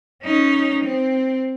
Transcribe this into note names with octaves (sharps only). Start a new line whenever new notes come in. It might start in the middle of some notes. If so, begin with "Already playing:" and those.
C#4 D#4
C4